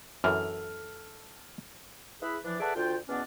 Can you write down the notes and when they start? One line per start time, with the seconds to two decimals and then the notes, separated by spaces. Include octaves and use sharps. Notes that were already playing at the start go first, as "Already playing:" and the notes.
0.24 F#2 E3 A4 F6
2.22 E4 G#4 B4
2.45 E3 F3 D4
2.60 G#4 A4 B4 D5 E5 F#5
2.76 D2 F4 G5
3.09 E2 B2 B3 C#4 D4